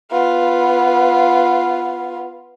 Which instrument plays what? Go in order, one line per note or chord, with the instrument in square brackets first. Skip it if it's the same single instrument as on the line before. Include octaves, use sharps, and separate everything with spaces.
[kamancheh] B3 F4